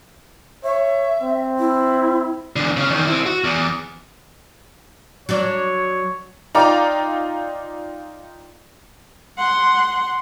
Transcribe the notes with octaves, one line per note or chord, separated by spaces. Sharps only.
C#5 E5
C4
E4
E2 D3
C#3 C#4
E2 D#3
C4 E4
F#4
E2
F#3 D4 C#5 D5
D#4 F4 D5 G5 A#5 D6
F#5 C6